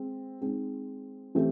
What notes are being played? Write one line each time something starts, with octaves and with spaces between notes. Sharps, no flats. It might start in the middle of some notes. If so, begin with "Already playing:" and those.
Already playing: G#3 C4
G#3 C4 D#4
E3 A3 C4 E4 G4